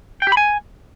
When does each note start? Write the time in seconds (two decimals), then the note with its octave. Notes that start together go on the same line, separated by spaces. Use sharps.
0.22 G5
0.27 G4
0.32 B5
0.37 G#5